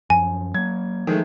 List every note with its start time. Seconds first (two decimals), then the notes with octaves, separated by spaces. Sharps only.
0.10 F#2 F3 G#5
0.54 F#3 A#3 G#6
1.07 D#3 F3 G#3 A3